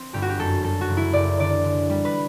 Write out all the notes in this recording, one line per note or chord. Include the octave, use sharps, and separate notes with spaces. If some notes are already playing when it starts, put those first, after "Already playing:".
Already playing: C4
G1 G4
F#4
G4
F#2 A4
F#3 A4
F#4
F#1
E4
F#1 D5
D3 D5
D3
G3
B4